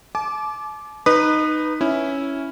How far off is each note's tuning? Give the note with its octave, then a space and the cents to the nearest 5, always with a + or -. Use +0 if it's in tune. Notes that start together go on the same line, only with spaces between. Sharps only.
A5 -45 D6 +0
D#4 -10 B4 +0 D#6 -30
C#4 +0 E4 -5